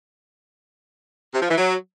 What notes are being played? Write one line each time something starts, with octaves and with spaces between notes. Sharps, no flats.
C3
F3
E3
F#3